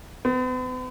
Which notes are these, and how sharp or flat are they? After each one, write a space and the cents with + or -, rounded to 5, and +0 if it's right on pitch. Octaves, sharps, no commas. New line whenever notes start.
B3 +45